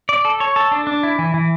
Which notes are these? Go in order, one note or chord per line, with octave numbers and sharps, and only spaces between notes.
D5
A4
C#5
A4
D4
D4
E4
E3
E3